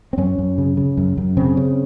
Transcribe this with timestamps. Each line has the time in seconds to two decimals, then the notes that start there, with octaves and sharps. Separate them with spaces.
0.13 C4
0.18 F#2 C#4
0.39 F#2
0.58 C#3
0.77 C#3
0.97 F#2
1.17 F#2
1.37 C#3 C4
1.57 C#3